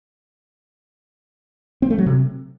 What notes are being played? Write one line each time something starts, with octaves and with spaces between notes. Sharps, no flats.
C4
A3
F#3
C3